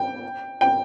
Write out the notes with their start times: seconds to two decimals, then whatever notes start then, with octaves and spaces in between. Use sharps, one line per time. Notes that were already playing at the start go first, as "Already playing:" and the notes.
Already playing: G5
0.61 G5